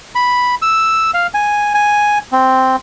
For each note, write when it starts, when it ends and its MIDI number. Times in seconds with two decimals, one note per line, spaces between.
0.15 0.55 83
0.62 1.11 88
1.14 1.27 77
1.34 1.73 80
1.74 2.18 80
2.32 2.76 60